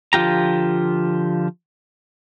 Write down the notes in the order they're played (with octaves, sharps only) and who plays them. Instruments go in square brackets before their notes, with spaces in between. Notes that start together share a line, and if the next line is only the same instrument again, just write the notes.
[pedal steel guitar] D3 F3 F4 G4 A#5